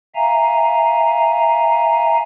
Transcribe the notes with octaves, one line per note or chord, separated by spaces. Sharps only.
E5 F5 G#5 A#5